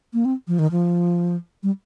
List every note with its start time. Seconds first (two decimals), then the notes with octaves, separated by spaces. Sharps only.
0.13 A#3
0.25 C4
0.48 F3
0.59 D#3
0.71 F3
1.63 G3